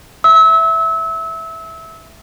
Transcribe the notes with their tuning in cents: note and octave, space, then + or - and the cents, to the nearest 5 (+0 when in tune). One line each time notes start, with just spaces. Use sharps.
E5 +0 E6 -30